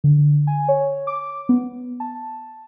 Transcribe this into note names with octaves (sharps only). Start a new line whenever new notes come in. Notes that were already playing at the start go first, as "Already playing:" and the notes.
D3
G#5
C#5
D6
B3
A5